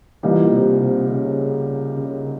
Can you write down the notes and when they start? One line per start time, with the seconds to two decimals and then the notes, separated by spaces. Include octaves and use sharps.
0.23 C2 A#2 E3 G3 A#3 D#4
0.52 C3
0.81 C3
1.10 C#3
1.97 C#3